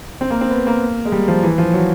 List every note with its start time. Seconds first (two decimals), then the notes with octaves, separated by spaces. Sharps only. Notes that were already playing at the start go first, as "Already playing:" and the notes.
0.21 C4
0.31 A#3
0.41 C4
0.51 B3
0.67 A#3
1.05 G#3
1.12 G3
1.28 F3
1.43 E3
1.58 F3
1.74 F#3